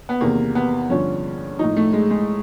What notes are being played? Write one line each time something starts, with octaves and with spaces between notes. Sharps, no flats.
B3
E2 C3 D#3 A#3
B3
G2 D3 F3 C#4
A2 F3 D#4
A3
G#3
G#3